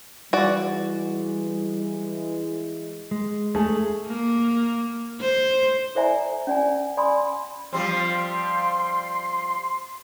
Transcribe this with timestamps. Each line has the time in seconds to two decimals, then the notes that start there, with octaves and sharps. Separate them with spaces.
0.33 E3 G3 G#3 F#4 D5
3.11 G#3
3.55 A3 G#4
4.08 A#3
5.21 C5
5.95 A4 C5 D5 E5 G#5 A#5
6.47 C#4 D5 G#5
6.97 D5 G#5 B5 C6 D#6
7.73 F3 G3 C4 C6